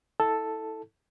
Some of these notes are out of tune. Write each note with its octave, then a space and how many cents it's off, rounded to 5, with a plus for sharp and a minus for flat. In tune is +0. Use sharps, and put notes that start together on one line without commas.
E4 -25 A4 +0